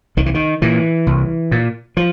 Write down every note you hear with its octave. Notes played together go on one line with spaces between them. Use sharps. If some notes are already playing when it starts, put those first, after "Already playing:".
C2 D#3
E3
D#3
A#2 E3
C2
A#2
F3